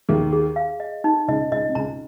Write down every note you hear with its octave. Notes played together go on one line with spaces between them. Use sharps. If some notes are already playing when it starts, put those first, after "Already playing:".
D#2 D#3 G#4
G#4
F5
D#5
D#4
C#2 C#3 D#5
C#2 C#3 D#5
C3
C#2 C#3 A#5